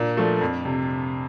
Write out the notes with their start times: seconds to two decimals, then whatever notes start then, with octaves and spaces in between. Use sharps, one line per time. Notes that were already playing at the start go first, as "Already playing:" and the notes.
Already playing: A#2 D4
0.17 F3 A3
0.41 F2
0.65 C3